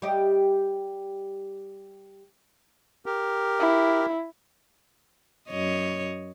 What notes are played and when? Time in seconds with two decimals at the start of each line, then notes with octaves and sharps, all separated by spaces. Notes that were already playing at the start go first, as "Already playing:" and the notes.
0.02 G3 G4 D#5
3.06 G4 A#4
3.60 E4
5.48 F#2 C#5 D#5